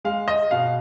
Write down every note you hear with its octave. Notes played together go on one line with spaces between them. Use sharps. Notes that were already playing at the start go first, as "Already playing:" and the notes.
G#3 F5
D#5
B2 F5